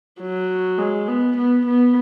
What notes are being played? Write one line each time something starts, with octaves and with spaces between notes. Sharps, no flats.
F#3
G#3
B3
B3
B3